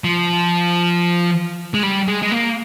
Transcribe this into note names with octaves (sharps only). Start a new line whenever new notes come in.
F3
G#3
G3
G#3
G#3
A#3